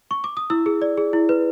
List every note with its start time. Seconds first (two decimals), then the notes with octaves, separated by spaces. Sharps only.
0.11 C#6
0.24 D6
0.37 D#6
0.50 E4 E6
0.66 G#4
0.82 D5
0.97 G#4
1.13 E4
1.29 B4